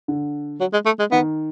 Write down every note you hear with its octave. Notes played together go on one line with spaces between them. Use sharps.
D3
F#3
G#3
A3
G#3
D#3 B3